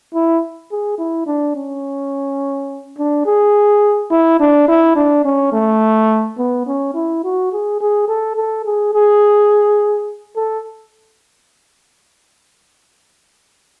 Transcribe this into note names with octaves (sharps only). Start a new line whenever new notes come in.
E4
G#4
E4
D4
C#4
D4
G#4
E4
D4
E4
D4
C#4
A3
B3
C#4
E4
F#4
G#4
G#4
A4
A4
G#4
G#4
A4